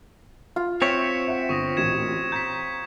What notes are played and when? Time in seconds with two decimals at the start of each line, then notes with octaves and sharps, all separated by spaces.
0.56 F4
0.82 C4 C#5 E5 C#6 B6 C#7 E7
1.27 E5 F#5
1.49 G1 C#6 D#6 A#6
1.77 A1 D2 A#2 G#6 C#7 E7
2.32 A#5 G6 B6